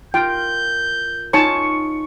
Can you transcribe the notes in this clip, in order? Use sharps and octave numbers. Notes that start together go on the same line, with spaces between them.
F4 A#4 G5 G6
D#4 F4 C#5 G#5 A5 C#6